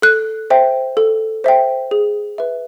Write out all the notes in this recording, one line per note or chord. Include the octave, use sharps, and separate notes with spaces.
A4 F#6
C5 E5 G5
A4
C5 E5 G5
G#4
B4 E5